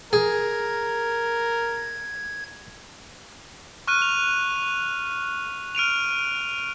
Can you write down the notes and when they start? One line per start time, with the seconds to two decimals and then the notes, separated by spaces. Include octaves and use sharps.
0.13 G#4 A#4 G#6
3.87 C#6 F6 F#6 D#7
4.02 F7
5.75 F6 D7 D#7 F7